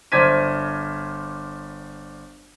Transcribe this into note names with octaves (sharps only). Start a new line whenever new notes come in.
G1 C5 D5 G#6 B6 D#7